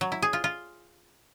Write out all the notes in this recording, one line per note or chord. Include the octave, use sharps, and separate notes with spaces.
F#3
E4
G#4
F4
F4